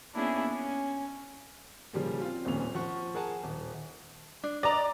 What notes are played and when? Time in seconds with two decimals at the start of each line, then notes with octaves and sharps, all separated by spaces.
0.15 A#3 B3 C#4 D4 E4 G#4
0.50 C#4
1.93 C#3 F3 G3 A#3
2.21 C4 F4
2.45 D#1 F2 A#2 C#4 F7
2.75 F3 F#5 C#6
3.15 G#4 A#4 F#5 G#5 A5
3.43 D#1
4.44 D4
4.63 D5 D#5 A#5